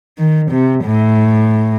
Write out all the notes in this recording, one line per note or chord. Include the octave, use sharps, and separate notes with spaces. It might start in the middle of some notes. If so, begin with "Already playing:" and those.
D#3
C3
A2